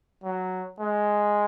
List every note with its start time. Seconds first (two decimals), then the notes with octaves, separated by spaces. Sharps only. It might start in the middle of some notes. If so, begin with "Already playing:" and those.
0.24 F#3
0.80 G#3